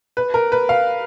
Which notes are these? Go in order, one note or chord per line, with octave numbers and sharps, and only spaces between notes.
B4
A#4
B4
F5